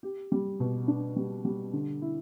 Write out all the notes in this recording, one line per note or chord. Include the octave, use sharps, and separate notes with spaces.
G4
G3
B2
D4
G3
G3
D3
E4